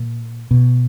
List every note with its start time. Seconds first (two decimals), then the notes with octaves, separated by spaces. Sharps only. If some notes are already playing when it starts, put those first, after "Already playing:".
Already playing: A#2
0.51 B2